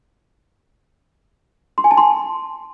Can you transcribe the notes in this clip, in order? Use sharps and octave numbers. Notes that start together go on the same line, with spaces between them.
C6
G#5
A5
C6